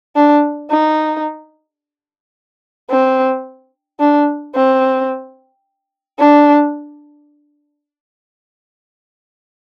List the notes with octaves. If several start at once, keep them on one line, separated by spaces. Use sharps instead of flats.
D4
D#4
C4
D4
C4
D4